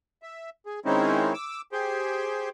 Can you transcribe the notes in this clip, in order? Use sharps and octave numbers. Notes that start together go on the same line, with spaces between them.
E5
G#4
D#3 G#3 C4 C#4 D#4 E4
D6 E6
G4 G#4 C5 G5